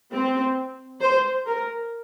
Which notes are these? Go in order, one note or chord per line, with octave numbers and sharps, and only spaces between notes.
C4
C5
A#4